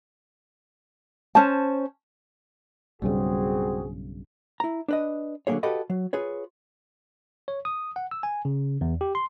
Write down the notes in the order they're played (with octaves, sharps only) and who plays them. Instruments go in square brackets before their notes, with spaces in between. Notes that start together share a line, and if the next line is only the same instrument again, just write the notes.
[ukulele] C#4 C5 A5
[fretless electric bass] B1 G2 C#3 [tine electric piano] G3 [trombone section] C4 F#4 G#4
[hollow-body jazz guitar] E4 A#5
D4 B4 D#5
D3 F#3 G#3 A#3 G#4 C#5
F#4 G4 A4 B4 D#5 F5
F#3
F4 G#4 B4 C#5
[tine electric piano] C#5
D#6
F#5
E6
G#5
C#3
E2
G4
C6